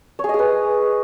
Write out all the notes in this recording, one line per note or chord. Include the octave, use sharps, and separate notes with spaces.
C#5
G#4
D#5
G#4
B4